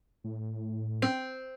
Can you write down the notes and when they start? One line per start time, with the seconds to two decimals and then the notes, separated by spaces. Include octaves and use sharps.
0.24 A2
1.02 C4